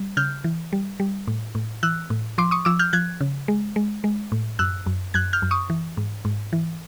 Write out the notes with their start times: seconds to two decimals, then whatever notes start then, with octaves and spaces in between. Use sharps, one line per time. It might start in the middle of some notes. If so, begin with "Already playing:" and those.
Already playing: G3
0.17 C#3 F6 G6
0.44 E3
0.73 G3
1.00 G3
1.27 A2
1.55 A2
1.83 E3 E6 F#6
2.10 A2
2.38 F3 C6 D6
2.51 C#6 D#6
2.65 F3 D6 E6
2.79 F6 G6
2.93 F3 F#6 G#6
3.21 C#3
3.48 G#3
3.76 G#3
4.04 G#3
4.32 A2
4.59 F#2 E6 F#6
4.86 F#2
5.14 F#2 F#6 G#6
5.33 F6 G6
5.42 F#2
5.51 C#6 D#6
5.70 E3
5.97 G#2
6.25 G#2
6.53 E3